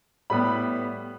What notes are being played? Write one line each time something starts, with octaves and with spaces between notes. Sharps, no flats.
A2 G3 B3 B5